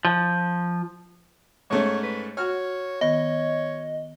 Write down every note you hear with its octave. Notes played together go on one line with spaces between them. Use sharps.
F3
G#2 A3 C#4 C#5
B4
F#4 C#5 F6
D#3 B3 C#5 D#5